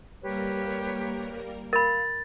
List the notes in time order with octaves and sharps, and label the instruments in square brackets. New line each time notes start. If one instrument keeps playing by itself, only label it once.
[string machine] G3 A#3 A#4 [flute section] G4 B4 C#5
[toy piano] A#4 B5 [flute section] F5 [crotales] A6